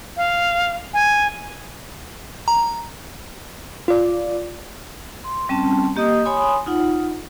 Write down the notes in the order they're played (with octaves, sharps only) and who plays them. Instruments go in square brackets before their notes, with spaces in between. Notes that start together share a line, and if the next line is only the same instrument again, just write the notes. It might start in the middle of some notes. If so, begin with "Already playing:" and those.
[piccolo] F5
G#5
[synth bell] A#5
[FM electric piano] F4 D5
[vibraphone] C6
G3 C4 C#4 A5
A#3 G4 D#5 D#6
C#5 G#5 B5 C6 D#6
D#4 F4 F#5